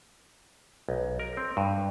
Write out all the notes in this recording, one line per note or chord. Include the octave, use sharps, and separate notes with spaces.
B1
A#4
C4
G2